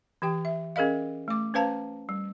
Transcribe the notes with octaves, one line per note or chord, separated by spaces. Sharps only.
E3 G4 G5
E5
C#4 G#4 A#4 D#5 F5
A3 D6
C#4 B4 C5 F5 A5 A#5
G3